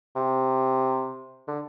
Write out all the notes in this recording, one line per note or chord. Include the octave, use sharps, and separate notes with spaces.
C3
D3